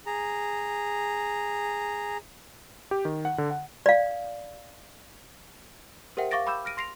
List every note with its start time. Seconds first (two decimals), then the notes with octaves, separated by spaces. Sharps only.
0.06 G#4 A#5
2.91 G4
3.05 D#3
3.25 F#5
3.38 D3
3.51 F#5
3.86 D5 F5
6.17 G4 A#4 C5 E5 F#5 G5
6.31 F5 C#6 D6 A6 A#6 D7
6.46 G5 B5 D6 E6 G6 E7
6.65 F6 A#6 D7 D#7
6.77 C6 A#6 C7 D7 F7